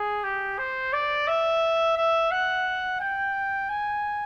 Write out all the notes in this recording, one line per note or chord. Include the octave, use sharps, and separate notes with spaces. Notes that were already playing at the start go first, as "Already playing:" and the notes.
Already playing: G#4
G4
C5
D5
E5
E5
F#5
G5
G#5